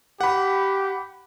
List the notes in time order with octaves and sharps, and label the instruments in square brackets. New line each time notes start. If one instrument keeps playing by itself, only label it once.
[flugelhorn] G4 [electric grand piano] F#5 B5